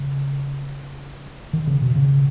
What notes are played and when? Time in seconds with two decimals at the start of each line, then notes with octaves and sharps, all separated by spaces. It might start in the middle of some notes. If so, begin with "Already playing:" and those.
Already playing: C#3
1.53 D#3
1.67 C#3
1.81 B2
1.96 C#3